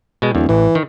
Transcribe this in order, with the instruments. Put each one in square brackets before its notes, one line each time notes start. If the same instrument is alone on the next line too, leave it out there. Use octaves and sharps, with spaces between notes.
[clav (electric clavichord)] B2 G#3
[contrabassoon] D1 [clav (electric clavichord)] E2
[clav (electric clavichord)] A1 [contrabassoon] E3
[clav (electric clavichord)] D#3